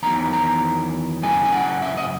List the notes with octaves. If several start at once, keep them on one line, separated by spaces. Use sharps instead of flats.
E2 D#3 F#3 B3 A#5
A#5
F#2 C#3 G#3 G#5
G#5
F#5
E5
D#5